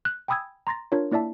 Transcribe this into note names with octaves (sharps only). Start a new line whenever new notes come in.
F#6
G5 G#5 B5 D#6 E6 G#6
A#5 C6 A6 A#6
D4 F4 A#4 C#5
A#3 E4 D5 E5 A5